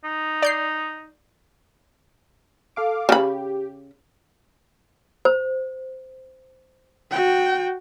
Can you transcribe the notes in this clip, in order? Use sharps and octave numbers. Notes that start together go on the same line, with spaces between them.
D#4
D5 G6 C7
A4 F5 D6
C#3 G4 B5
C5
F#4 G5